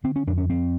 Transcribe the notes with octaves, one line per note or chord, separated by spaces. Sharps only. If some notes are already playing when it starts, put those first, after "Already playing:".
D3 C4
C#4
F2 D4
C#4
F2 C4